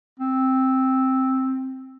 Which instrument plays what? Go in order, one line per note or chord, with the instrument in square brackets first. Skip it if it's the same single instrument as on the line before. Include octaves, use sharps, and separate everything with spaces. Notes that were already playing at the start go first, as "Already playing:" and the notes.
[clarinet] C4